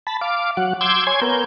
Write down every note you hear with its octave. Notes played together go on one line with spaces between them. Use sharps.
A5 B5
F5 D6
F#3 F#5
C6 D6 E6 G6 G#6
C#5 G#5 C6 G#6
B3 A#4 G6